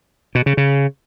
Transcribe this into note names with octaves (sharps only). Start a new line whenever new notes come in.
B2
C#3
C#3